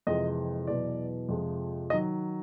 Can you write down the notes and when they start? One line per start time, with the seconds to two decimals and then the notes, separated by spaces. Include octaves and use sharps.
0.07 F2 C3 E3 G#3 D#5
0.67 E2 B2 F#3 D5
1.29 F2 C3 F3 G#3
1.90 D#3 F#3 D#5